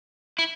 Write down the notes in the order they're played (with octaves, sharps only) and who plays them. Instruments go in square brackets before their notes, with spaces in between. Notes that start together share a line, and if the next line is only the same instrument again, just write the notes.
[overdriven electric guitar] E4